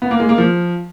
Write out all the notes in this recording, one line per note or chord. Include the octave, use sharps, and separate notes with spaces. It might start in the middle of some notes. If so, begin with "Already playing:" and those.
B3
A#3
G#3
A#3
F3